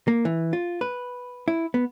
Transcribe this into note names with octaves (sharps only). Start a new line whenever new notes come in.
A#3
E3
F4
B4
E4
B3